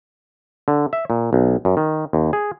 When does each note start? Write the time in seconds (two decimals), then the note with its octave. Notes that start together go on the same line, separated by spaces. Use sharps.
0.68 D3
0.93 E5
1.10 A#2
1.33 B1
1.65 F#2
1.77 D#3
2.13 D#2
2.33 G#4